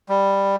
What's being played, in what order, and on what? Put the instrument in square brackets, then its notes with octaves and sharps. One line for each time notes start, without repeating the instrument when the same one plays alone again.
[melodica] G3